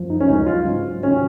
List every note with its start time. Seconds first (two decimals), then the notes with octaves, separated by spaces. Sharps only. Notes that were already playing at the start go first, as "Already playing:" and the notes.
Already playing: F#2 F3
0.10 D#4
0.20 C#4
0.28 C#2 C#3 F#3 D#4
0.46 F4
0.65 G#2 F#3
1.02 C3 D#3 F#3 C#4